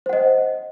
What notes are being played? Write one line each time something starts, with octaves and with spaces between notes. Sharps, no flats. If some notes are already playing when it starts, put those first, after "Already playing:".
C5 D#5 F#5